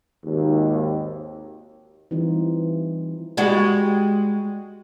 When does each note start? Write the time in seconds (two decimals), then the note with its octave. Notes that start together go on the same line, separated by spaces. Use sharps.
0.25 G#1 D#2
2.11 E3 G3 C4 D#4 F4
3.37 G3 G#3 F#4